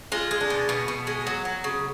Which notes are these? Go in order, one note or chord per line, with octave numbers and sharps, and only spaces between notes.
G#3 F4
G#3
D4
B2
B2 B3
B2
G#3
F#3
F#3
C#3